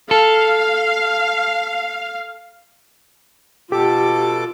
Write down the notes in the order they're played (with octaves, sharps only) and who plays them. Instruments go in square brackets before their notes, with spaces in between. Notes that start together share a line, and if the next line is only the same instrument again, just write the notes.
[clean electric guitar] A4 [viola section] F5
[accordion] B2 A4 D6 [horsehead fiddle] F4 [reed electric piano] G4